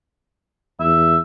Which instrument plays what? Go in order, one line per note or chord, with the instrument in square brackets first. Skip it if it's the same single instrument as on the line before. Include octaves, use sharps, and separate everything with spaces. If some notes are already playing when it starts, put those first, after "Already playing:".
[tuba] E2 [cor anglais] E5